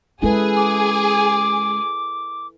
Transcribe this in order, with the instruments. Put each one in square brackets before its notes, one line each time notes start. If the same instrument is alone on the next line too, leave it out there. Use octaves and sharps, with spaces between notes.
[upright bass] G#3 C#4 [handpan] E4 A4 B4 [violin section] G#4
[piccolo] D6